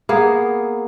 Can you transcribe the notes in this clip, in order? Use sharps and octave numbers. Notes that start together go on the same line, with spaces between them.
A#3 B3 G#4